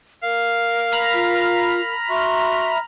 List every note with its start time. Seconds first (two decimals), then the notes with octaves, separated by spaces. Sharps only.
0.23 A#4 F5
0.92 A#5 B5 F6
1.14 F4
2.10 F#4 E5 C6